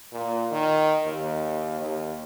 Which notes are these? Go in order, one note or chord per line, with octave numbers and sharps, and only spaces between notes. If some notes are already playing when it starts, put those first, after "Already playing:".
A#2
D#3
D#2
D#2